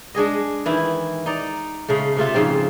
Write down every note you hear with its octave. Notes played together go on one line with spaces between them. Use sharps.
G#3 D4 G#4 D#5
D#3 E3 E4
D#4 D5
C#3 G#3 A3
C3 A3 F4 E5
G#2 C#3 F3 C4